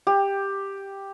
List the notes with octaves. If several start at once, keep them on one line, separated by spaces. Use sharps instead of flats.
G4